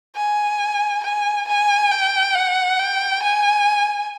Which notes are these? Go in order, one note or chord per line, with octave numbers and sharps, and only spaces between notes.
G#5
G#5
G#5
G5
F#5
G5
G#5